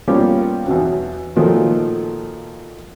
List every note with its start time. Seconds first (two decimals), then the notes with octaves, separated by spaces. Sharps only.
0.08 G3 A#3 B3 C#4 F4 G4
0.66 E2 B2 F#3
1.36 A#2 D#3 F3 F#3 A3